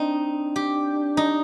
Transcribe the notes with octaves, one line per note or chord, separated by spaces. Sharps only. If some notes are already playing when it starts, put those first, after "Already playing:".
Already playing: C4 D4 D#4
G4
D#4